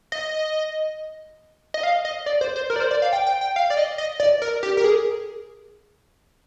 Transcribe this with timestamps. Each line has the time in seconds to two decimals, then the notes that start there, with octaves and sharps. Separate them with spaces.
0.12 D#5
1.74 D#5
1.83 F5
2.05 D#5
2.26 D5
2.41 C5
2.56 C5
2.70 A#4
2.76 D5
2.80 C5
2.91 D5
3.02 F5
3.13 G5
3.26 G5
3.41 G5
3.56 F5
3.70 D5
3.77 D#5
3.98 D#5
4.20 D5
4.42 A#4
4.63 G4
4.77 A#4
4.84 G#4